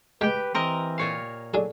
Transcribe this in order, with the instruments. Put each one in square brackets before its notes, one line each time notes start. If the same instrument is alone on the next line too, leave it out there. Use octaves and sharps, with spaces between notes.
[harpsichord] G#3 [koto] G4 G5 [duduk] B4
[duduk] E3 [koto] C4 A#4 D#5
[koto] A#2 C#5 F5
[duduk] F#3 [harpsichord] D4 G#4 A4